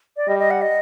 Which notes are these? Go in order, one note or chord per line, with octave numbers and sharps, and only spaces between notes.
D5
G3 D#5
D#5
F#5
D#5